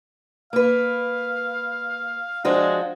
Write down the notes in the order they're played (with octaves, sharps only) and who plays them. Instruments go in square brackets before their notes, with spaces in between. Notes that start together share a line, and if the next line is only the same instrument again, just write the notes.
[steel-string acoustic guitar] A#3 B4 [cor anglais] F5
[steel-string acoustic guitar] F3 D4 F#4 [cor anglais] G#3